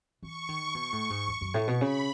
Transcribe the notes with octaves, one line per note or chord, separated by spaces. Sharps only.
E3 C#6
D#3
B2
A2
G#2
E2
F#2
A2
B2
C#3 B5